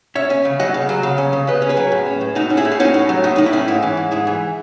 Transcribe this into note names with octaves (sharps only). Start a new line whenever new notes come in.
C#4 C#5 E5
C#4
C#3
F#3 D#5 F#5
C#3
F#3
C#3
C#4
C#3
C#3 B4 D#5
C#4
G#4 B4
F#3
A2
C#4
A2
A2 D#4 F#4
C#4
E4 G#4
A2
G#4
C#4 D#4 F#4
A2
F#3
A2 D#4
A2 D#4
E4
C#4
G#2 E4
E3
G#2
G#2 E4 G#4
E3